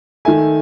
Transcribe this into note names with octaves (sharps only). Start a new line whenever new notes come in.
D#3 A3 E5 G#5